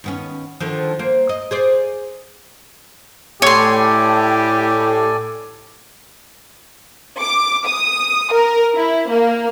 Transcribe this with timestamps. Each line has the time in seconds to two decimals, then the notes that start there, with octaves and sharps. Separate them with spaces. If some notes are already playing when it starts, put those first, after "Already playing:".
0.04 D#2 B3 C#4
0.60 D3 D#3 F3
0.99 A#3 C5
1.29 D#5
1.51 G#4 C5 D5
3.42 A2 G4 A4 C#5 D5 G#5 C6
7.21 D6
7.67 D#6
8.33 A#4
8.76 E4
9.09 A#3